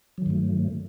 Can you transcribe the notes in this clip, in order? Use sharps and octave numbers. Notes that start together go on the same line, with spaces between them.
G2 D#3 F#3 A3